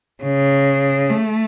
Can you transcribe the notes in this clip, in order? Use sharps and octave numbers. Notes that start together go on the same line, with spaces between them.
C#3
A3